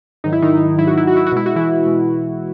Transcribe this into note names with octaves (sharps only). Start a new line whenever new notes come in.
G#2 D#3 F#3 D#4
E4
D#3 D#4
G#2 D#3 F#3 E4
F#4
E4
F#4
E4
F#4
B2 G#3 E4
F#4
E3 E4
B2 G#3